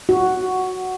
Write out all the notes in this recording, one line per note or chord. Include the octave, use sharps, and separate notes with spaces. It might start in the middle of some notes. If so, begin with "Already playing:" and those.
F#4